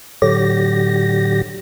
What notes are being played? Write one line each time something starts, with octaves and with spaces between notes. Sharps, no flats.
A2 D3 F#3 G4 A#6